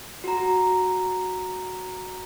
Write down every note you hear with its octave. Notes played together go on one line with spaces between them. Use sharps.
F#4 A#5